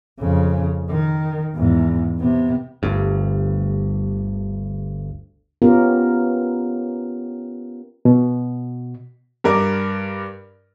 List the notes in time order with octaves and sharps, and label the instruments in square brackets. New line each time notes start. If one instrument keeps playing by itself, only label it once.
[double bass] F2 C#3
D#3
E2 G#2
C3 B3
[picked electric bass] G1 D2 G2
[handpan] B3 C#4 F4 G4 A#4
[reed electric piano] B2
[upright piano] G2 A#4 D5 D6